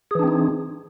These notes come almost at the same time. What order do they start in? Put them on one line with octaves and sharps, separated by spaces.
G#4 E3 D4 C4 D#4